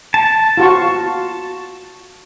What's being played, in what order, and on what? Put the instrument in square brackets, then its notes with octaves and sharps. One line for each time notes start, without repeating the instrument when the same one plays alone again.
[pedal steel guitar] A5
[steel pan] F4 F#4 C#6